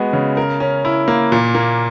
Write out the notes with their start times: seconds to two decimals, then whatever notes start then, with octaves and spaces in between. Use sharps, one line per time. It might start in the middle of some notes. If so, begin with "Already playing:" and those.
Already playing: G#3 B3 F#4
0.13 C#3
0.37 A#4
0.60 C#4
0.85 E4
1.08 A#3
1.32 A#2
1.55 A#3